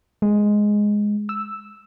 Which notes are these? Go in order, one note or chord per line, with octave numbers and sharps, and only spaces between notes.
G#3
E6